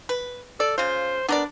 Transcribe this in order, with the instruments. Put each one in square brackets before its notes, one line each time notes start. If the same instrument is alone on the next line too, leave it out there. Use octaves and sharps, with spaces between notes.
[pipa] B4
[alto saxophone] A4 [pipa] D5
[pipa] C#3 F4 [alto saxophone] C5
[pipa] B3 A#4 D5 [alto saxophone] D4